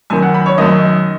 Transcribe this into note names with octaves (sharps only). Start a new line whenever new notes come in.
F#2 D#3 G#5
F#5
B5
C#5
F#2 D#3 D#5